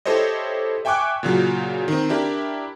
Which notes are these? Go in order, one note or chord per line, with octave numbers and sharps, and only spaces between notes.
E4 G4 A4 C5 C#5 D#5
E5 G5 G#5 C#6 D6 F#6
A#2 C#3 F#3
D#3 C4
D4 E4 G4 A#4